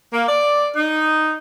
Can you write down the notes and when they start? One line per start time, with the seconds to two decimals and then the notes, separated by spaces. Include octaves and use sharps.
0.13 A#3
0.28 D5
0.75 D#4